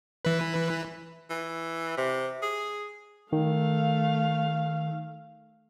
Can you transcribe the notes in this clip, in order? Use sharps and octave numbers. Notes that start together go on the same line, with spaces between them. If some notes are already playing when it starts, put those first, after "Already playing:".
E3 B4
E3
C3
G#4
D#3 A3 F5